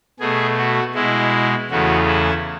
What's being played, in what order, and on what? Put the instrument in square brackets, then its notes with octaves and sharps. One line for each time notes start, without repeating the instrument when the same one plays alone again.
[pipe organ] B2 A3 G#4
F#4
B2 G#3 E4
E2 C#3 E3 A3 F#4
E4